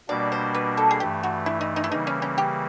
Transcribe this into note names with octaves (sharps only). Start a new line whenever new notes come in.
B2 G3 A#3 D4 D5
C5
B4
A4
G#4
G2 E3 A3 G4
F#4
E4
D#4
D#4
E4
C#3 E3 G3 A#3 D#4
C#4
C#4
G4